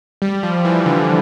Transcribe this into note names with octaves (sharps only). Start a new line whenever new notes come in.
G3
F3
E3
D3